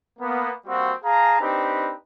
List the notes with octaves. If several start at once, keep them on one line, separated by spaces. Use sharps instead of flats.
A#3 B3
G3 A#3 C4 F#4
G#4 F5 A5 A#5
C4 D4 D#4 G4 B4